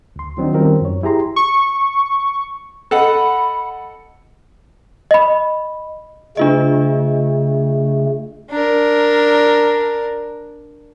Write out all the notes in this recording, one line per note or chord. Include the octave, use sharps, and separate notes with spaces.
D2 C6
D#3 F#3 C4 D4 D#4
D#3 G3 C4 C#4 F4 A#4
F#2 C#5
E4 G4 G#4 A#5 C6
C#6
A4 D#5 F#5 B5
D#5 B5
C#3 A3 D4 F4 D#5
D4 A#4